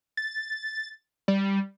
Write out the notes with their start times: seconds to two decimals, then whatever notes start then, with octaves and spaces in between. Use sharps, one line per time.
0.17 A6
1.28 G3